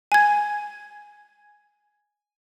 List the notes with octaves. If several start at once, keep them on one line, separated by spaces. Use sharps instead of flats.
G#5 G#6